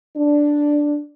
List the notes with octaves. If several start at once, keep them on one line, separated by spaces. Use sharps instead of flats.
D4